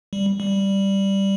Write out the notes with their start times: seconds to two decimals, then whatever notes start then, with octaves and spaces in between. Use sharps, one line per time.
0.13 G3
0.40 G3